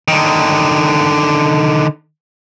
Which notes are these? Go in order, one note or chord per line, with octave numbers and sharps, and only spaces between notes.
D3 D#3